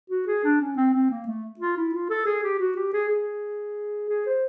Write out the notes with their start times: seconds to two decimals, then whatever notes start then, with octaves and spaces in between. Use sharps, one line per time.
0.10 F#4
0.27 G#4
0.44 D4
0.61 C#4
0.77 C4
0.94 C4
1.10 A#3
1.27 A3
1.59 F4
1.77 E4
1.93 F4
2.10 A4
2.26 G#4
2.43 G4
2.59 F#4
2.76 G4
2.93 G#4
3.09 G#4
4.09 G#4
4.26 C5